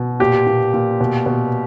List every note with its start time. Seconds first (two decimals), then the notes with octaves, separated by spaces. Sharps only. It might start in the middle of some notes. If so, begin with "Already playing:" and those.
Already playing: B2
0.20 A#2 G4
0.47 A#2
0.74 A#2
1.00 B2
1.26 B2